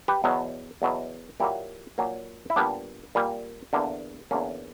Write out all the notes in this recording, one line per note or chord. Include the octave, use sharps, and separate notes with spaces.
G4 B4
E2 B2 F#3
E2 B2 F#3
A#2 F#3 A#3 E4 G4
A#2 F#3 A#3
E4
A#2 G3 A#3 B3 D4
A#2 G3 A#3
E2 D3 A#3
E2 D3 A#3 C#4